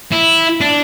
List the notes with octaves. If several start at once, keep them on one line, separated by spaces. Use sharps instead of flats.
E4
D4